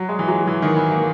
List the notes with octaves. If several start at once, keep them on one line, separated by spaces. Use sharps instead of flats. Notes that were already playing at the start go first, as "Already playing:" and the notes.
Already playing: F#3
G#3
E3
F#3
E3
D#3
E3
A#3